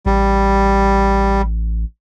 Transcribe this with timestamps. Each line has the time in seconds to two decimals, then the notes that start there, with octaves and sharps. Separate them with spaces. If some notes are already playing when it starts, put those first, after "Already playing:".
0.06 A1 G3